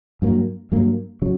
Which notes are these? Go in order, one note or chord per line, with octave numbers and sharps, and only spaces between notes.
G2 F#3 A#3
G2 F#3 A#3
C#3 F#3